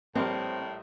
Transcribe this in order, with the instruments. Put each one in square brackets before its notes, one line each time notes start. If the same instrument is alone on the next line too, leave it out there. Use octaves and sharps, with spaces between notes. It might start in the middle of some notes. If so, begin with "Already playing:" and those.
[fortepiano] A#1 G3 A#4 [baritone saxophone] A2 [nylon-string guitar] C4